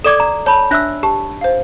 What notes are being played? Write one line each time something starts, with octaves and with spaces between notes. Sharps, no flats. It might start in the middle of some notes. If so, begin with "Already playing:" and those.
A4 D5 D6 G#6 E7
A#5
C#5 A5 B5
D4 E5 E6 F#6 A#6
G4 A5
C5 F5